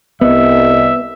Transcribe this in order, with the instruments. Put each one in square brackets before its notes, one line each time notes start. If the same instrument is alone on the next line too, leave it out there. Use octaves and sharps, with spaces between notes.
[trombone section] C2 [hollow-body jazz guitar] B3 [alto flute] D#5 [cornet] E5